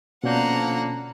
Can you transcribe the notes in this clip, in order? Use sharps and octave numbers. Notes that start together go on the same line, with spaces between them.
B2 D3 F3 A#3 C#4 F#5 A#5 G6